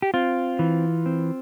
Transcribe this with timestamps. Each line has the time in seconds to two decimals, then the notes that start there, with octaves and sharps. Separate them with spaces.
0.02 G4
0.14 C4 F4
0.59 E3
1.06 C4